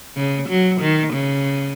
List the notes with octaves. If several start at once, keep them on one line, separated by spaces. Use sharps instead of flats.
C#3
F#3
D#3
C#3